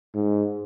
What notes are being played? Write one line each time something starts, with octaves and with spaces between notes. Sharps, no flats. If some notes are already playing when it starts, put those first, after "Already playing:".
G#2